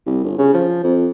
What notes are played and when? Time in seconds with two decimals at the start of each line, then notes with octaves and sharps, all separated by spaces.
0.06 C2
0.24 G1
0.38 C#3
0.54 F3
0.84 F2